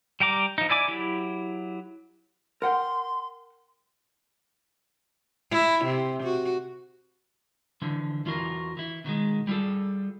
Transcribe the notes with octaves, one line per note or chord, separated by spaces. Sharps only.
G3 G5 A#5 D6
F3 D#4
E4 D5 G#5 D6
F#3 E4 G4
A#4 F#5 G5 C6
E4
C3
F#4
D3 E3 F3
E2 E3 F4 F#4 A#4
E3 E4
B2 D#3 F#3 G#3
G3 E4 F4 G#4 A4